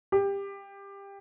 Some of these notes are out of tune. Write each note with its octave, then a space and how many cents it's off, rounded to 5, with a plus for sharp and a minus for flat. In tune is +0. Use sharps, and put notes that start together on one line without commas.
G4 +20